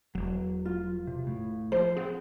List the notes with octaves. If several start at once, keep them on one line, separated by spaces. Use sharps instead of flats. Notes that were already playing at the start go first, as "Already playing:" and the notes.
E1 F#3
F4
C3
A2
F3 C5
C4 G#4 F#5